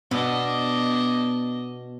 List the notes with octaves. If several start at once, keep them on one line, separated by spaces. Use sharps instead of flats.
B2 B3 D4 D#5